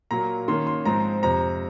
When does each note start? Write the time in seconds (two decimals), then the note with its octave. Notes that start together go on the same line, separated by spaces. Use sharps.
0.11 A#2 F#3 A#3 A#5
0.48 D#3 A#3 C#4 C6
0.67 C6
0.85 G#2 F3 G#3 C4 A#5
1.22 F2 C3 F3 A#5